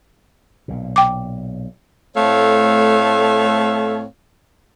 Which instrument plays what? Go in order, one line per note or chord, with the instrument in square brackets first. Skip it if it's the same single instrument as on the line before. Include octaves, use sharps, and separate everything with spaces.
[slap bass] B1 A#2
[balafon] G5 D6
[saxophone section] A2 A3 C4 A4 C#5 F5